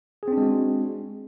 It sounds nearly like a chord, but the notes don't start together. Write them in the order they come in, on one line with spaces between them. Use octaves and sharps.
G#4 C4 D4 G#3 F#4